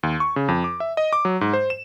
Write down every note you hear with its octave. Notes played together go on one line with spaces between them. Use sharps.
D#2
C#6
C#3
F2
D6
E5
D#5
D6
F#3
G#2
C5
E7